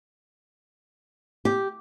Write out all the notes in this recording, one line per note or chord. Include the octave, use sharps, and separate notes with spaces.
G4